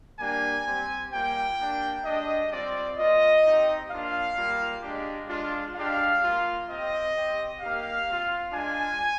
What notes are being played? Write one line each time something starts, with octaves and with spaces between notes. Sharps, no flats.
G3 A#3 D4 G4 G#5
G3 C4 G4
G3 A#3 F4 G5
A#3 D4 G4
G#3 D4 G4 D#5
G3 C4 F4 D5
A#3 F4 D#5
C4 D#4 G4
A#3 D4 F4 F5
G3 A#3 F4
G#3 D4 G4
G#3 D4 F4
G#3 D4 G4 F5
A#3 F4
C4 G4 D#5
C4 G4
A#3 D#4 G4 F5
C4 F4
G#3 D4 F4 G#5